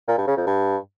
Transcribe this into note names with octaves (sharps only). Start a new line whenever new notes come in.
A#2
G2
C#3
F2
G2